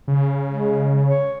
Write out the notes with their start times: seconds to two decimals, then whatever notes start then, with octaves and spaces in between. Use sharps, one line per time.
0.08 C#3
0.49 G#3
1.06 C#5